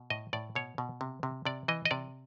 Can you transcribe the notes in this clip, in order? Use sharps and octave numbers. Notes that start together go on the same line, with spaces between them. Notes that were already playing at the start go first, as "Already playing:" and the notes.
Already playing: B2
A2 D#5
A2 D5
B2 C#5
B2
C3
C3
C3 D5
E3 D#5
D#5
C3 D5